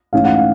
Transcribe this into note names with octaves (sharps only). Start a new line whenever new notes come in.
G#2 E3 A3 C#4 F5
F#5
F5